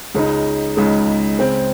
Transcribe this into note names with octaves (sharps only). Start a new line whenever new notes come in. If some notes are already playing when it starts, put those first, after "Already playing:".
C#2 C#3 G#3 D#4
C#2 C#3 G#3 D#4
C#3 G#3 C4